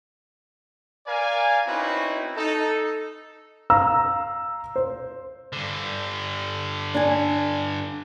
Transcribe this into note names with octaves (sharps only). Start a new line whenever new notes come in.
A#4 D5 F5 G#5
C4 C#4 D#4 E4 F#4 B4
D#4 A4
F5 A#5 E6
C5
G2 D3
D4 G#5